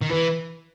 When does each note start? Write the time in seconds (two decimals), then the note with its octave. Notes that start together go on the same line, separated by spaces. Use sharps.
0.01 D#3
0.09 E3 B4